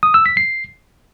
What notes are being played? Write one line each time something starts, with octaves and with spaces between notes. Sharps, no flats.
D#6
E6
B6
C7